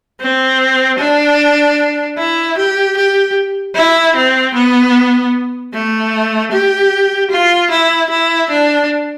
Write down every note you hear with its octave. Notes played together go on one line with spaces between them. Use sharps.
C4
D4
E4
G4
G4
E4
C4
B3
A3
G4
F4
E4
E4
D4